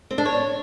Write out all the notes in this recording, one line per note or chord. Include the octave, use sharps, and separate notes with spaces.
C4
D4
C#5